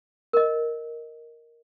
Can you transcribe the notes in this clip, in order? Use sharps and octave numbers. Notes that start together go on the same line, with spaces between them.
A#4 D#5